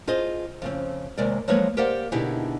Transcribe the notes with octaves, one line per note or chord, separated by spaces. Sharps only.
F4 G#4 C5 D#5
F2 C#3 C4
D#2 C3 G#3 A#4 D5
F3 F#3 G#3 A#3 B4 C#5
G4 A#4 C5 D5 F5 F#5
B2 D3 D#4 E4 G4 G#4